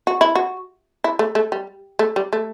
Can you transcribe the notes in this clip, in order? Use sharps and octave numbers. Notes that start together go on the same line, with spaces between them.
F#4
E4
F#4
E4
A3
A3
G3
A3
G3
A3